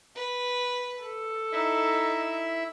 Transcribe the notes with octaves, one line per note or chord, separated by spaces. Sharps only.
B4
A4
D#4 E4 E5